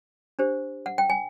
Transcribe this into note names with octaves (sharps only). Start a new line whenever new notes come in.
D4 G4 C5
F#5
G5
G#5